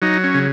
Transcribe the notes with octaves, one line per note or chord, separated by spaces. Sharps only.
F#3 D#4
C#4
C#3